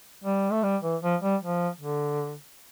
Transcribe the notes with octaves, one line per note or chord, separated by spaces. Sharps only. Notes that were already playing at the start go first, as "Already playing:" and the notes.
G3
A3
G3
E3
F3
G3
F3
D3